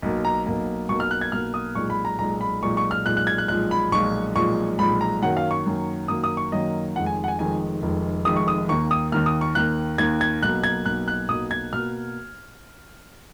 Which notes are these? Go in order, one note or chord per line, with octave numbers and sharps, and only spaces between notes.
B1 B2 A#3
A#5
B1 B2 A#3
B1 B2 A#3 C#6
F6
F#6
G#6
B1 B2 A#3 F6
D#6
B1 A#2 G#3 C#6
B5
A#5
B1 A#2 G#3 A#5
B5
B1 A#2 G#3 C#6
C#6
F6
B1 A#2 G#3 F#6
F#6
G#6
F#6
B1 A#2 F3 G#3 F#6
B5
B1 A#2 F3 G#3 C#6
B1 A#2 F3 G#3 C#6
B1 A#2 F3 G#3 B5
A#5
F#2 D#3 F#3 A#3 F#5
F5
C#6
F#2 D#3 F#3 A#3
F#2 D#3 F#3 A#3 D#6
D#6
C#6
F#2 D#3 F#3 A#3 D#5
F1 F2 D#3 G#3 F#5
G#5
F#5
G#5
F1 F2 D#3 G#3 G#5
F1 F2 D#3 G#3
F1 F2 D#3 G#3 D#6
C#6
D#6
D#2 D#3 A#3 C#6
D#6
D#2 D#3 A#3 F6
D#6
C#6
D#2 D#3 A#3 F#6
D#2 D#3 A#3 G#6
G#6
B1 B2 A#3 F#6
G#6
B1 B2 A#3 F#6
F#6
B1 B2 A#3 D#6
G#6
B2 A#3 F6